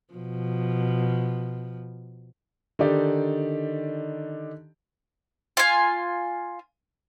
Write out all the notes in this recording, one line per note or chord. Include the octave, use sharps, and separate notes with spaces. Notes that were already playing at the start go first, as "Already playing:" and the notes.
B2 F3
D3 D#3 D#4 G4 D5
F4 G#5